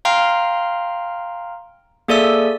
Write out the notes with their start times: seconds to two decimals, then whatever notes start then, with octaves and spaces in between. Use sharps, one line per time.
0.05 F5 G5 A#5 C6 F6
2.08 A#3 G#4 A4 D5 E5 E6